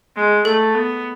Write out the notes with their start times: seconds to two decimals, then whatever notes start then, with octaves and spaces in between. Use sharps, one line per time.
0.16 G#3
0.45 A3 A4
0.75 B3